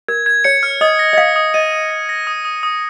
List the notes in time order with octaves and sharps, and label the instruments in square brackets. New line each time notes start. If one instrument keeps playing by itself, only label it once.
[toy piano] A#4 [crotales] G#6
[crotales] G#6
[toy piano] C#5 [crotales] C#7
[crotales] F6
[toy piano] D#5 [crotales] D#6
[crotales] A#6
[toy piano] D#5
[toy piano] F5 [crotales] D#6
[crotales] D#6
[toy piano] D#5 [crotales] D#7
[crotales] D#6
A#6
A#6
D#6
D#6
D#6